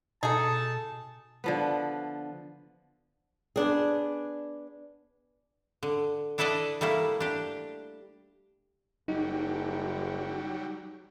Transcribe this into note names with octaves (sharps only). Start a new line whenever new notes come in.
B2 D#4 G#4 A4 A5
D3 F3 B3
B3 D4 G#4
D3
D4 E4 A4 B4 D5 D#5
G3 A3 A#3 E4
D4 G4
F#1 F#3 G3 D#4